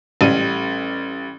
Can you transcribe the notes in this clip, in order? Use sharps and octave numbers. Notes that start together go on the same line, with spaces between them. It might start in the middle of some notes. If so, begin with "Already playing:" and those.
A1 G3 D#7